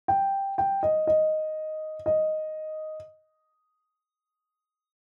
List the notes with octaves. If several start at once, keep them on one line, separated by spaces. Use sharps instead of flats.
G5
G5
D#5
D#5
D#5